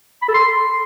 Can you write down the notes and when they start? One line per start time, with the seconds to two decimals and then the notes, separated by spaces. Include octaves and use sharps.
0.22 B5
0.28 A4
0.35 C6